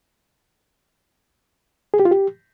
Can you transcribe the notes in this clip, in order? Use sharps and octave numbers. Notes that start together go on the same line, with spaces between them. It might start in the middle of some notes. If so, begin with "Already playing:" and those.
G#4
G4
F4
G4